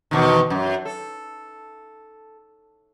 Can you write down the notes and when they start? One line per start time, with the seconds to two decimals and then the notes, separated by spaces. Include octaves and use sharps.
0.11 E2 B2 D#3
0.50 F#2
0.85 A4